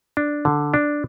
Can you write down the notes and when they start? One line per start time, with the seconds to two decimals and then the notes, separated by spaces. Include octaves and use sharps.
0.17 D4
0.45 D3
0.74 D4